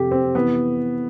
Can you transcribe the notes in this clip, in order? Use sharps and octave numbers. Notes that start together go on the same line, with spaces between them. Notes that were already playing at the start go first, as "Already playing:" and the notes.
Already playing: F2 C3 G4 A4
C4
E3 B3